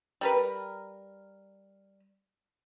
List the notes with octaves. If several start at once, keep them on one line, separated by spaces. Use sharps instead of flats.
G3 A#4 B4